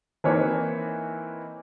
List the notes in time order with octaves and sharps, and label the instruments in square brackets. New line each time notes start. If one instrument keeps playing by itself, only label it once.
[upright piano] E3 A#3 C4 D#4 B4 C#5